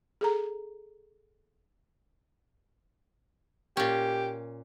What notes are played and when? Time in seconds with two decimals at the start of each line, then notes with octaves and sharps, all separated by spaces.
0.21 G#4 A4 A#5
3.77 A#2 C#4 G4